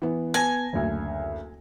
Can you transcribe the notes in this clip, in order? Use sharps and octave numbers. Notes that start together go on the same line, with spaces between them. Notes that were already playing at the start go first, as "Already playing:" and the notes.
E3 B3
B3 G#5 A5 A#6
F#1 D2